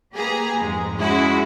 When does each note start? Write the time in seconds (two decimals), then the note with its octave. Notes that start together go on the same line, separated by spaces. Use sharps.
0.14 A#3 G4 G#4 B4 G#5 A#5
0.57 F2 G#2 G#3
0.97 G#3 C#4 E4 F#4